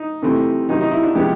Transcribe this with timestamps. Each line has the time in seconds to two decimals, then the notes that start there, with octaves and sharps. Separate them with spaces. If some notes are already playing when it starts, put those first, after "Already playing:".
Already playing: D#4
0.22 C3 E3 A3 C4
0.68 C3 D#3 F#3 D#4
0.81 D#4
0.91 E4
1.04 D4
1.15 C3 F3 G#3 B3 G4